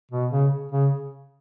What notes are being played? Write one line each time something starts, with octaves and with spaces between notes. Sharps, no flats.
B2
C#3
C#3